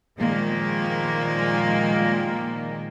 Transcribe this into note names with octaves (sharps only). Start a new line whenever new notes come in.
A#2 D#3 F3 G#3 A#3